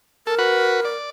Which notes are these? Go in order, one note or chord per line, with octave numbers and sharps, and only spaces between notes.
A4 A#4
F#4 B4
D5